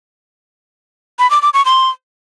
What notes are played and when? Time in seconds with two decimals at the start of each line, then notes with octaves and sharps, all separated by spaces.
1.19 B5
1.31 D6
1.42 D6
1.54 C#6
1.65 C6